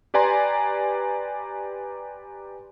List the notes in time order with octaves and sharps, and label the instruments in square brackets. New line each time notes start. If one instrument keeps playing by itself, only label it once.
[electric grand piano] G4 B4 D5 G#5 A#5 C6